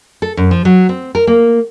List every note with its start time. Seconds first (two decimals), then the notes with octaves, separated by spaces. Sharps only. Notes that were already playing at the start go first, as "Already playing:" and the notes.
0.22 A4
0.37 F#2
0.51 F3
0.65 F#3
0.89 C4
1.15 A#4
1.27 A#3